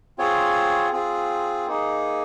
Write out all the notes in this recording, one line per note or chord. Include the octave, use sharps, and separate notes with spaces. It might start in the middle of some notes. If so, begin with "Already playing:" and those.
C4 F4 G#4 C#5
C4 F4 G#4
A#3 D#4 G#4